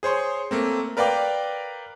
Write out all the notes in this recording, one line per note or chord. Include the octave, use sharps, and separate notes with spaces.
G#4 C5 C#5 C6
A3 A#3 C4
A#4 B4 D5 F5 G5 D6